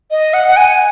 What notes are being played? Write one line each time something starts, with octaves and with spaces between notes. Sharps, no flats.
D#5
F#5
F#5
G#5